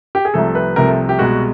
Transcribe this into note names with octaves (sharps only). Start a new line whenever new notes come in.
G4
G#4
C2 C3 F3 A3 A4
B4
C2 C3 F3 A3 A#4
A4
G4
C2 B2 G#3 F#4